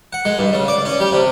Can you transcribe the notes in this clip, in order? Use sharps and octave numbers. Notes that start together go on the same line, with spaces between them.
F#5
G#3
G2
C#3
D5
C#4
G3
C3